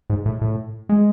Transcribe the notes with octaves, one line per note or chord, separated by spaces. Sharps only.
G#2
A2
A2
G#3